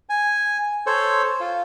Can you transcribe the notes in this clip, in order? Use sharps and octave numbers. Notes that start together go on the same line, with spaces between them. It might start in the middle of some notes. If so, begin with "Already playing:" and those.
G#5
A4 C5 C#5
F4